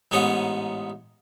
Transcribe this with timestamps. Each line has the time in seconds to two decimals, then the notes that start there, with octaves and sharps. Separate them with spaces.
0.11 A1 G#2 B3 C#4 D#4 G#4